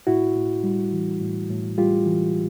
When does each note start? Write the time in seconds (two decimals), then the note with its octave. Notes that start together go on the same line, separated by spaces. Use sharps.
0.07 A2 E4 F#4
0.36 A2
0.64 G3
0.93 E3
1.21 A2
1.50 A2
1.78 G3 F4 G4
2.06 E3